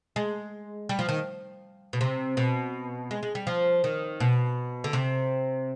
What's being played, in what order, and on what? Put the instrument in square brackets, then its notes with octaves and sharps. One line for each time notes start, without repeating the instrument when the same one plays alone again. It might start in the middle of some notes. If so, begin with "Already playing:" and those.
[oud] G#3
G3
F3
D#3
B2
C3
B2
G#3
G#3
G3
F3
D#3
B2
D3
C3